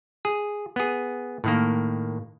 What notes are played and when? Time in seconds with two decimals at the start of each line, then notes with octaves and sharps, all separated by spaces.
0.25 G#4
0.76 B3 G#4
1.44 A2 D#3 A#3